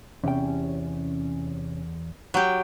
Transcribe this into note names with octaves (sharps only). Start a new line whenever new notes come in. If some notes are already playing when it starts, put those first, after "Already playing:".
E2 C3 C#4 G5
F#3 G4